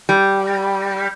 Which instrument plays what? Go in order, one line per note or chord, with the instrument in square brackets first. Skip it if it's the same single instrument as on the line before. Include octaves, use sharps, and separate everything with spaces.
[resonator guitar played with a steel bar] G3